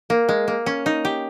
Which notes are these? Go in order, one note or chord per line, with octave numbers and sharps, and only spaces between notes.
A#3
G#3
A#3
C#4
D#4
G4